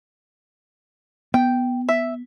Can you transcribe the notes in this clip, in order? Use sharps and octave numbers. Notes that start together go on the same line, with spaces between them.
B3 G5
E5